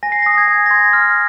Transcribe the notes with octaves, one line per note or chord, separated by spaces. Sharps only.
G#5 A#6
C7
A#6
D#6
G#6
G#5
A#6
C6 G#6
F6